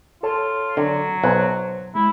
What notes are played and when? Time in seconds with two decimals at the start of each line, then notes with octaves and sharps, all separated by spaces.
0.23 F4 A4 C#5 A5
0.77 D3 F#3
1.24 B1 C5 F#6 G#6
1.95 G#3 E4